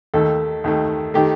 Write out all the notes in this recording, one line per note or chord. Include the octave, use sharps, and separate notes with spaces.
D#2 D#3 A3 A4
D#2 D#3 A3
D#3 A3 G4